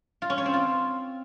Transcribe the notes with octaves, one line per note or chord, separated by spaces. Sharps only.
F4
C#4
C#5
C4
F4